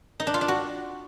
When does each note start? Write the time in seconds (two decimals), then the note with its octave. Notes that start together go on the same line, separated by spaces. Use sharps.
0.20 D#4
0.27 D4
0.34 F4
0.41 D4
0.48 F#4